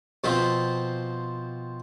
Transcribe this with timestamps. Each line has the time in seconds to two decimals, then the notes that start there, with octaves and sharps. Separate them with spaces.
0.24 B2 F3 C4 F4